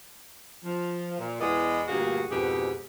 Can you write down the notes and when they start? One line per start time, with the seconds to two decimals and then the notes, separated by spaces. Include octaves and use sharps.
0.65 F3
1.19 A#2
1.40 E2 G#3 B3 E4 D5 D#5
1.88 D2 G2 A#2 A#3 F#4 G#4
2.31 F2 G#2 B2 G4 G#4